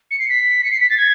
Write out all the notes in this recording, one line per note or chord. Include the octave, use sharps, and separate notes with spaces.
C#7
C7
B6
C#7
C7
B6
A6
G#6